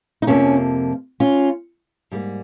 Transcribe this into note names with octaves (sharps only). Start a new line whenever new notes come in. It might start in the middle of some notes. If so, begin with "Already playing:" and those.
D#4
F2 C3 F3 A#3 C#4
C#4 F4
G#2 G3 A#3